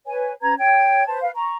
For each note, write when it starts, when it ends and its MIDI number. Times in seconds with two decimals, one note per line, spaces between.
0.06 0.31 71
0.06 0.31 73
0.06 0.31 80
0.41 0.55 61
0.41 0.55 71
0.41 0.55 82
0.41 0.55 92
0.58 1.06 73
0.58 1.06 79
0.58 1.06 92
1.07 1.20 71
1.07 1.20 72
1.07 1.20 81
1.22 1.30 71
1.22 1.30 77
1.35 1.57 82
1.35 1.57 85